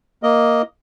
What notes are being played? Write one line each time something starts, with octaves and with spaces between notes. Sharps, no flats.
A#3 D#5